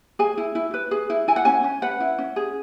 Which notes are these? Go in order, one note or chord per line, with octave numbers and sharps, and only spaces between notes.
G#4 G#5
E4
E4
B4
G#4
E4
E4 G#5
F#5
C#4 G#5
C#4
B4 F#5
E4
C#4
G#4